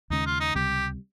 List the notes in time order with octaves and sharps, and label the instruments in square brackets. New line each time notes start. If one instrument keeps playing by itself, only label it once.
[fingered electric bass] D#2 C#3 G#3 C#4 [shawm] D#4
[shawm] F4
D#4
[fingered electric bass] C#2 C3 G3 [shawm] G4